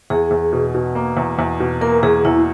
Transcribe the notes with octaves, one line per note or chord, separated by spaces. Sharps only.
E2 G#4
E2
B2
B2
A#3
E2
E2
B2
A#3 A#4
E2 G#4
E2 E4